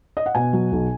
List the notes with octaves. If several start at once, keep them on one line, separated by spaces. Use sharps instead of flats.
D#5
F#5
B2 G#5
F#3
B1